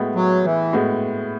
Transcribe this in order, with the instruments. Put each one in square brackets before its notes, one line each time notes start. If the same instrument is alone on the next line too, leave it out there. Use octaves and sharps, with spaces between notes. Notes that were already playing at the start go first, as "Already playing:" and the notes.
Already playing: [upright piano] A2 G#3 B3 F#4
[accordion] F#3
E3
[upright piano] A2 G#3 B3 F#4